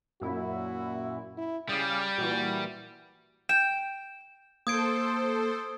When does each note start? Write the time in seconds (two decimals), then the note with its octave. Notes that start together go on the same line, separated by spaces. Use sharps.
0.21 F#2 A#2 E4 F#4
1.37 E4
1.69 C#3 G3 G#4 D5 F5
2.18 A#2 E3 F#4
3.49 G5 E7
4.67 A#3 A4 C5 D#6 G#6 D7